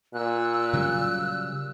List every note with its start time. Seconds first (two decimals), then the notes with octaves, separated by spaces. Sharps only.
0.14 A#2 E6 F#6
0.74 C#3 F#3 G3